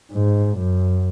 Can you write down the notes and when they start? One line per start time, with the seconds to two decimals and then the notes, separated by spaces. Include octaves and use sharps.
0.13 G#2
0.58 F#2